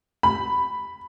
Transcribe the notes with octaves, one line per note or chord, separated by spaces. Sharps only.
B5